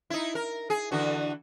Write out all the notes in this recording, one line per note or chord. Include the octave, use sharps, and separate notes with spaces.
D#4 E4
A#4
G#4
D3 E3 F#4